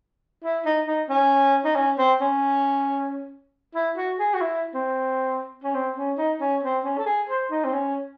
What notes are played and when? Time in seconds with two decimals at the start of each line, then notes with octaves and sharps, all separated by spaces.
0.44 E4
0.65 D#4
0.88 D#4
1.10 C#4
1.65 D#4
1.76 C#4
1.98 C4
2.21 C#4
3.75 E4
3.97 F#4
4.19 G#4
4.34 F#4
4.42 E4
4.74 C4
5.64 C#4
5.75 C4
5.96 C#4
6.18 D#4
6.41 C#4
6.63 C4
6.84 C#4
6.98 A4
7.06 G#4
7.29 C5
7.51 D#4
7.65 C4
7.73 C#4